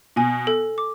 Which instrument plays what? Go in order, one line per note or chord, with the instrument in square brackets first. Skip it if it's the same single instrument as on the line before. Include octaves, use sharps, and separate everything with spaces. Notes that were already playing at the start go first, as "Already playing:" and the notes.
[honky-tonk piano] B2 [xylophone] G#5
[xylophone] A4
D6